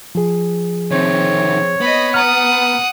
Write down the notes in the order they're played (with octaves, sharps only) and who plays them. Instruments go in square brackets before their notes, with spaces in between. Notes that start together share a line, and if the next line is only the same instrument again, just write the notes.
[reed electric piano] F3 G#4
[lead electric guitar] C3 D#3 [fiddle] C4 [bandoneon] C#5
[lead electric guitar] B3 [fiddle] D#5 B5
[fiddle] F#5 D#6 [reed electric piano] A#5 F6